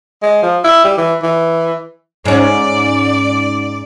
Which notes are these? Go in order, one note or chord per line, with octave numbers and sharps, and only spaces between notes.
G#3
F3
E4
G3
E3
E3
G#2 C#4 D5